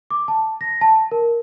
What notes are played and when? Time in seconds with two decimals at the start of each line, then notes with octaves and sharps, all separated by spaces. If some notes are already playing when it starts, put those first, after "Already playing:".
0.11 D6
0.28 A5
0.61 A#6
0.81 A5
1.12 A#4